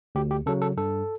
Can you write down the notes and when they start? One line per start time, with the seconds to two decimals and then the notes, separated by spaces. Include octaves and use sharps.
0.15 D2 G4
0.31 G4
0.46 C#3 F#3 A4
0.62 A4
0.77 G2 A4